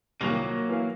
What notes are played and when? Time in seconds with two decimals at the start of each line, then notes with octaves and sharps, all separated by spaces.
0.21 C2 A#2 D#3 F#3 A#3
0.69 E3 F5